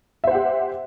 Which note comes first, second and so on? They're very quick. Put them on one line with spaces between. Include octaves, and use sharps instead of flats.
E5 C5 F#5 G4